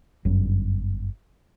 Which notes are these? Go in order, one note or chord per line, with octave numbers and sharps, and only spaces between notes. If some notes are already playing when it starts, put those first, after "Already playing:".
G1 F#2 F#3